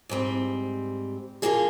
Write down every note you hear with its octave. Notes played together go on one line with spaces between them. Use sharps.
G#2 G3 C4
D3 F3 A#3 F4 G#4